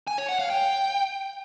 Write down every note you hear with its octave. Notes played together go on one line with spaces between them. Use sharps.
G#5
C#5
F#5
F5
G5